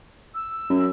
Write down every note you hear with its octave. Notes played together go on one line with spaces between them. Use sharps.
E6
F#2